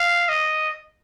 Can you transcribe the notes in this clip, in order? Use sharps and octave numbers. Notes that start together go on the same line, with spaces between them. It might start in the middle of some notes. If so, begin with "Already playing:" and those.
Already playing: F5
D#5